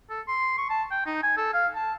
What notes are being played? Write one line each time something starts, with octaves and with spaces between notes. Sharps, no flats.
A4
C6
C#6
A5
G5
D#4
G#5
A4
F5
A5